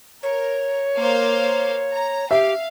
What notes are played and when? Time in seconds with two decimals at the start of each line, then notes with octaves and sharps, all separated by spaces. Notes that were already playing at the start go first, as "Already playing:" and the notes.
0.23 A#4 C#5
0.97 A#3 C5 F5
1.91 A#5
2.31 G4 E5 F5